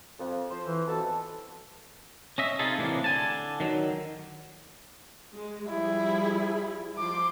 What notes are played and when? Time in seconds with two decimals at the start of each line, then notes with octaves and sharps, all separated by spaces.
0.19 F2
0.51 F3 C5
0.65 E3
0.88 F2 B2 A4 A5
2.38 C#4 D#5 E5
2.59 C3 D#4 F4 G#4 A4
2.79 A2 C3 E3 A#3 D4
3.04 D3 G#5 A5
3.60 D#3 F#3
5.35 G#3
5.69 F3 G3 E4 G#4
6.98 F3 C6 D6